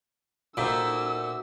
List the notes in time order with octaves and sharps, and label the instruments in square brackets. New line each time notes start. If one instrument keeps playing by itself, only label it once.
[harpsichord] A#2 [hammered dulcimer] D#4 E5 D6 [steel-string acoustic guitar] F#4 A4 C5 [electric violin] E6